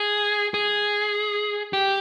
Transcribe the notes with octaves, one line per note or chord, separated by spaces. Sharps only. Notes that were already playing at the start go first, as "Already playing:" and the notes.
Already playing: G#4
G#4
G4